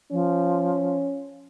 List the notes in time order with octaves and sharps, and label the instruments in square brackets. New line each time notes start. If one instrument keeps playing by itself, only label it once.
[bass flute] F3 [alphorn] C#4